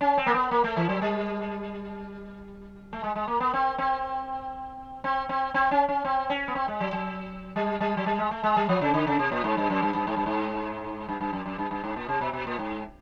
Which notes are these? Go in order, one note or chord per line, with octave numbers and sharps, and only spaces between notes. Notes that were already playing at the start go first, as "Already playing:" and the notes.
C#4
C4
A#3
B3
A#3
A3
E3
F#3
G3
A3
G#3
G#3
A#3
B3
C4
C4
C4
C4
C4
C#4
C#4
C4
C#4
B3
C4
G#3
F#3
F#3
G3
G3
F#3
G3
G#3
A3
G#3
G3
F3
C#3
D3
C#3
C3
A#2
G#2
G2
F#2
G2
G2
G#2
G2
G#2
G2
G2
F#2
F#2
G2
G2
G#2
A#2
C3
B2
B2
A#2
G#2